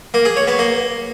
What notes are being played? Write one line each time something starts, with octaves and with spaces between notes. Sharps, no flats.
A#3
G#4
C#5
B3
A#3